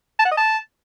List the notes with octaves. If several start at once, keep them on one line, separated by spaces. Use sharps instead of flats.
A5
F#5
D#5
A5